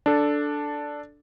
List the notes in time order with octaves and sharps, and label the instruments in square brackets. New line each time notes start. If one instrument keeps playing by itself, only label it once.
[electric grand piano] D4 A4